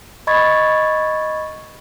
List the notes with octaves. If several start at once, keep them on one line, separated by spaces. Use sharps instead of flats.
D#5 B5 C#6 G#6 A6